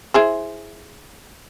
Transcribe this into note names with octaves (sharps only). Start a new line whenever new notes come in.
E4 G#4 C5